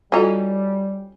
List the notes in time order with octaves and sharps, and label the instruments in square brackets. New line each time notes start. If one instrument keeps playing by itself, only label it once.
[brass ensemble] G3 [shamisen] C#4 D#4 [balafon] F4 F#4 A4